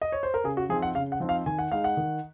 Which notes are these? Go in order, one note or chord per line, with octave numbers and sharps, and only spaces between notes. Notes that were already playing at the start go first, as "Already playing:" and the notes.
D#5
C#5
C5
A#4
C#3 G#4
F#4
F3 C4 D#4 G#4
F#5
C#3 F5
F#5
F3 C4 D#4
F5
D#3 G#5
F#5
G#3 D#4 F5
F#5
D#3